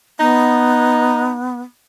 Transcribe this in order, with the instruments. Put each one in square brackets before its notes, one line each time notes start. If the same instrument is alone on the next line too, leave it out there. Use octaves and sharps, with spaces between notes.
[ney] B3 [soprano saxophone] D#4